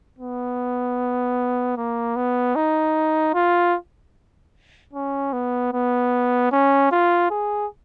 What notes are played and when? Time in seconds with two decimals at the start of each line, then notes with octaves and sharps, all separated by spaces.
0.19 B3
1.77 A#3
2.16 B3
2.56 D#4
3.34 F4
4.93 C#4
5.33 B3
5.73 B3
6.52 C#4
6.92 F4
7.31 G#4